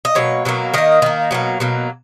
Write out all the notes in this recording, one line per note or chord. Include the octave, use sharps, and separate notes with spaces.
D#5
B2 F#3 A#3 C#5
B2 F#3 A#3
D#3 A#3 D#5
D#3 A#3
B2 F#3 A#3
B2 F#3 A#3